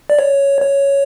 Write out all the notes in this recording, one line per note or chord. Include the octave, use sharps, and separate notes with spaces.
D5
C#5
C#5